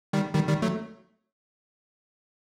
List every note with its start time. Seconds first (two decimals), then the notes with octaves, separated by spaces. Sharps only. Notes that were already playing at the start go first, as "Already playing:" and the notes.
0.13 D#3 G3
0.34 D#3 G3
0.48 D#3 G3
0.62 F#3 A3